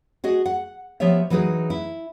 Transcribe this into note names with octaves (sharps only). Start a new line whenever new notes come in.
F#4 G#4 D#5
F#5
F3 B3 G4 C#5 E5
E3 F#3 D#4 G#4 B4
E4